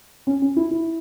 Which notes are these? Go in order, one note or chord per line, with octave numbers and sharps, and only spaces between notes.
C#4
C#4
E4
E4